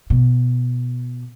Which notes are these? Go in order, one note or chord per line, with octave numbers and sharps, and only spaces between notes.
B2